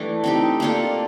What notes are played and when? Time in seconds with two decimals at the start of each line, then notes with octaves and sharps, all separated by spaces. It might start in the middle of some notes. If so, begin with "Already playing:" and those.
Already playing: E3 A3 D4 E4 G4
0.24 C4 D#4 G4
0.60 A#3 D4 F4 A4